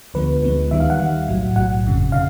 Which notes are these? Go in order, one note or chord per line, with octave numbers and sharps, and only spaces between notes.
D2 D3 F3 G#3 B3 B4
D2 D3 F3 G#3 B3
D#2 D#3 G3 E5
F5
F#5
D#2 D#3 G3
B1 A2 F#3
B1 A2 F#3 F#5
G1 F2 C#3
C#3 F5